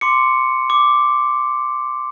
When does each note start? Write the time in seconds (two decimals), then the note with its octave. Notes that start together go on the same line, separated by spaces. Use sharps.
0.01 C6 D6 C#7
0.70 D6